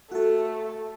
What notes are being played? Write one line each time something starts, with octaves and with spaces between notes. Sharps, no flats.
A3 F#4 A4
A5